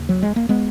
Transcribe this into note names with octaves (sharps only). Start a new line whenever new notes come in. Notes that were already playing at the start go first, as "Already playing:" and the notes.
Already playing: D#2 C#3
F#3
G#3
A#3
G#3 B3